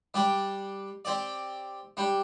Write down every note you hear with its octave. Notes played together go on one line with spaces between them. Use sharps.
G3 D4 G4 D5
C4 G4 D5
G3 D4 G4